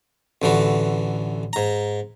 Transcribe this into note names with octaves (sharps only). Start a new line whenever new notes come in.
A1 D3 E3 F#4
G#2 A#5